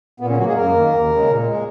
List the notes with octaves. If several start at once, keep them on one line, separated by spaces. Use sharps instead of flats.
A#2 B3
C#3 C#4
F#3 F#4
A#3
G#3 G#4
F#2 A#3 A#4
D#3 A#3
D#2
C#3 G#3
A#2
G#3